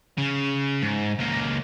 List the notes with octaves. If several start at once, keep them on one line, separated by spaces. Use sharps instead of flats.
C#3
G#2
C#2 A#3